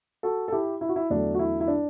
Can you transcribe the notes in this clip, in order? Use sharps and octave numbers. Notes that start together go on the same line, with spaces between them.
F#4 A4
A4
E4 G4
E4
F#4
E4
E2 D3 F#3 A3 D4
F#4
E4
E4
D4